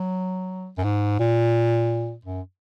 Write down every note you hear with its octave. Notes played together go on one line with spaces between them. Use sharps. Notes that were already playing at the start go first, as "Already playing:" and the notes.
Already playing: F#3
F#2
G#2
A#2
F#2